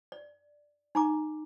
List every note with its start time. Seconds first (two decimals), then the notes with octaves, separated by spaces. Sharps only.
0.12 D5
0.95 D#4 A#5 D6